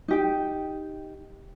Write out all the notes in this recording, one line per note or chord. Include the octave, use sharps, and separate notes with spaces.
D#4 G4 G5